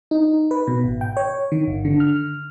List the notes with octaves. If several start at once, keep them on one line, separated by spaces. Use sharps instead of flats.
D#4
B4
B2
G#1
G5
C#5
D#3
G1
D3
F6